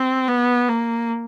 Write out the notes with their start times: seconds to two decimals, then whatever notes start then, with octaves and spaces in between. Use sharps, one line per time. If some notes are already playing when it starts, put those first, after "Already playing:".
Already playing: C4
0.28 B3
0.69 A#3